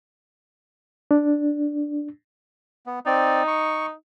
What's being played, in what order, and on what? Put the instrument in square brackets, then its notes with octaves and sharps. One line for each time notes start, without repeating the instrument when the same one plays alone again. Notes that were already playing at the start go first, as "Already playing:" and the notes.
[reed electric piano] D4
[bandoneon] B3
[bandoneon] C4 D5 [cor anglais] D#4
[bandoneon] C#6